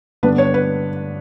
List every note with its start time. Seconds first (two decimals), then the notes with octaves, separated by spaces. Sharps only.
0.23 G2 D3 G3 B3 D4 B4
0.38 C#5
0.54 B4